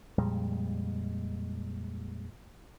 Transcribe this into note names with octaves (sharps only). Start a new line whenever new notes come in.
F2 A#2 G3 G#3